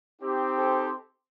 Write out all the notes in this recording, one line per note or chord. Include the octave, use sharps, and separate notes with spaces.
C4 D#4 G4
A4 C5